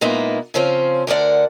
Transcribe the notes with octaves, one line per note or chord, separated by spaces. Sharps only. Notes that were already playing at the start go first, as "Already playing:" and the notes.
A#2 G#3 A#3 B3 D#4 E4
C#3 F3 C4 C#4 G#4 C5
D2 D3 A#4 D5 F#5